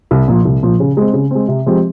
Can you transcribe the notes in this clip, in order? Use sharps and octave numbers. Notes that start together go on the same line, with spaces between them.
C2
A#2 F3
C2
A#2 F3
C#3
G#3 C4
C#3
G#3 C4
C3
F3 G#3 C4 G4